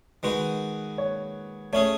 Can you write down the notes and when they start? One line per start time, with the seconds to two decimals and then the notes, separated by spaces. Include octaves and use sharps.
0.23 D#3 G#3 D#4 F#4 B4
0.98 C#5
1.73 A3 C#4 G#4 C#5